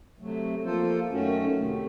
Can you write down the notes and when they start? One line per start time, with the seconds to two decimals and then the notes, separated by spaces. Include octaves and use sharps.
0.19 C3 F#3 A3
0.64 F3 A#3 F4 A4 C5
1.09 F#2 D#3 A3 C#4 F#4
1.54 C3 D#3 A3